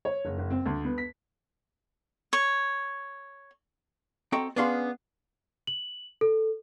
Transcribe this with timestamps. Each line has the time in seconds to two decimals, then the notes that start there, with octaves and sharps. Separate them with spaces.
0.05 C#5
0.25 F#1
0.38 F#1
0.50 C4
0.66 D2
0.85 B3
0.98 B6
2.33 C#5
4.32 C4 F#4 A4 D#5 G5 A#5
4.56 B3 C#4 D4 G#4 F5 C6
5.67 F#7
6.21 A4